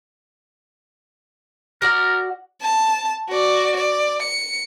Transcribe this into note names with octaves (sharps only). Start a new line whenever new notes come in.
F#4 A#4 D5 F#5
A5
F#4 D5
D5
C#7